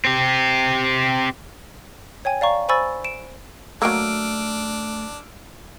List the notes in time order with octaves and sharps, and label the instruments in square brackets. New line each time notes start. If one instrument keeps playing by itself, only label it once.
[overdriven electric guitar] C4 G4
[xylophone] C#5 G5 G#5
D5 F5 A#5 C#6
C5 G#5 B5 C#6 E6 A6
D7 E7
[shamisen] F#3 A#3 [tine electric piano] A3 [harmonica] D4 [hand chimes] E6 F6 D7